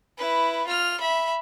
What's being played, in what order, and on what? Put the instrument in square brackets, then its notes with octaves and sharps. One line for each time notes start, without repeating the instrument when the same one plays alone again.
[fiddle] E4 B4
F4 F6
E5 B5